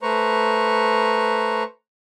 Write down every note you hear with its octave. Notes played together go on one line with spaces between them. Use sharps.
A3 B4 C5 A#5 C#6